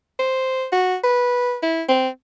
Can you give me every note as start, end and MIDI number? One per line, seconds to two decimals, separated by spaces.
0.19 0.65 72
0.72 0.96 66
1.03 1.57 71
1.63 1.82 64
1.89 2.08 60